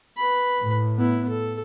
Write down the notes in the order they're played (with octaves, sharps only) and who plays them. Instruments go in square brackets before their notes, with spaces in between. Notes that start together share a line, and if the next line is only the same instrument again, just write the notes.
[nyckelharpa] B4 B5
[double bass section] A2
[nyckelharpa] B3 E4
A4